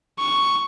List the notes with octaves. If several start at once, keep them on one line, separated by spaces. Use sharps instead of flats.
C#6